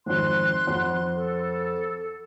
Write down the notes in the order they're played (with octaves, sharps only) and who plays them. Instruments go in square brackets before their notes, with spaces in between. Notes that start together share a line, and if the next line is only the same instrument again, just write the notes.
[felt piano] G#1 F2 [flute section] C6 F#6
[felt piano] F2 F#5
[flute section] A4